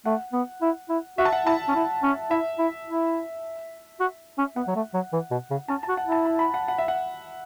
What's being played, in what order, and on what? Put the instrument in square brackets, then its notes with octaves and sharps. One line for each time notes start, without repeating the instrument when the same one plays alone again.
[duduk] A3 [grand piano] F#5
[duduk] B3
E4
E4
[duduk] F#4 [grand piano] E5
[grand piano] A5
F#5
[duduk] E4 [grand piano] A5
[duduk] C#4
E4
C#4
[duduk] E4 [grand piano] E5
[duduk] E4
E4
F#4
C#4
[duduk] B3 [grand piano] F#5
[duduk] F#3
A3
F#3
E3
B2
C#3
[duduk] C#4 [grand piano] A5
[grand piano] A5
[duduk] F#4
[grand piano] F#5
[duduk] E4
[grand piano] A5
B5
B5
F#5
F#5
E5
F#5